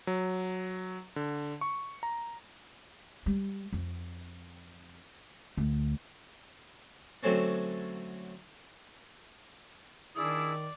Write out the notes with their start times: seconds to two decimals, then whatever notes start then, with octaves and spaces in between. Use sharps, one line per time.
0.07 F#3
1.16 D3
1.61 C#6
2.03 A#5
3.26 G3
3.73 F2
5.57 D2
7.23 D3 F#3 A3 C4 C#4
10.16 D#3 D4 E4 G#4 D5 D#6